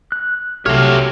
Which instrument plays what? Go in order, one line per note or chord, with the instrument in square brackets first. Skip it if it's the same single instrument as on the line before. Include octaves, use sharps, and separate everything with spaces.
[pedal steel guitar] F#6
[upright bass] C2 [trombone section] F#3 A3 [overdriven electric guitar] C4 C#5 [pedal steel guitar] G4 F6